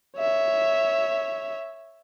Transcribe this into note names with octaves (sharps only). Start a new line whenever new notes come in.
C#5 E5